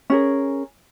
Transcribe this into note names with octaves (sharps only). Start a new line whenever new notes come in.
C#4 G#4 A#4